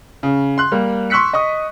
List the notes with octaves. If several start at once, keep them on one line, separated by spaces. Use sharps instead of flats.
C#3
C6 F#6
G3 A#3
C6 C#6 E6 F#6 B6 C#7
D#5 C#6 D#6